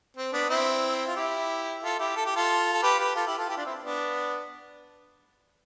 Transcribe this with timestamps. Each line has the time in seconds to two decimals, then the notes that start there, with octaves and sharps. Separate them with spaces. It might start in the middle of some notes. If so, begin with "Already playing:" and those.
0.17 C4
0.33 B3 D4
0.50 C4 E4
1.07 F4
1.16 E4 G4
1.83 F4 A4
1.99 E4 G4
2.16 A4
2.26 G4
2.36 F4 A4
2.73 A4
2.83 G4 B4
2.99 G4 B4
3.16 F4 A4
3.27 E4 G4
3.38 F4 A4
3.49 E4 G4
3.57 D4 F4
3.66 C4 E4
3.82 B3 D4